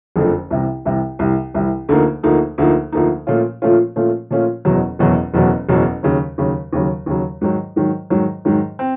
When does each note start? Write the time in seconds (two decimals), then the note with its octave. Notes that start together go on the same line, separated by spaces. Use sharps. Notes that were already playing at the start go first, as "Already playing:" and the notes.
0.16 F#1 F2 D3 F3 A3
0.50 C2 C3 E3
0.85 C2 C3 E3
1.19 C2 C3 E3
1.54 C2 C3 E3
1.89 D2 D3 F3 A#3 D#4
2.23 D2 D3 F3 A#3 D#4
2.58 D2 D3 F3 A#3 D#4
2.92 D2 D3 F3 A#3 D#4
3.27 A#2 F3 A3 C#4 F4
3.62 A#2 F3 A3 C#4 F4
3.96 A#2 F3 A3 C#4 F4
4.30 A#2 F3 A3 C#4 F4
4.65 F#1 E2 B2 F#3
4.99 F#1 E2 B2 F#3
5.34 F#1 E2 B2 F#3
5.69 F#1 E2 B2 F#3
6.03 D#2 C#3 F#3
6.38 D#2 C#3 F#3
6.73 D#2 C#3 F#3
7.06 D#2 C#3 F#3
7.41 G#2 D#3 F#3
7.76 G#2 D#3 F#3
8.10 G#2 D#3 F#3
8.45 G#2 D#3 F#3
8.79 C4